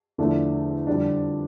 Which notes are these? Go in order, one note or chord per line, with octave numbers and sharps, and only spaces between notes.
E2 D3 F3 A3 D4
F2 D3 G3 D4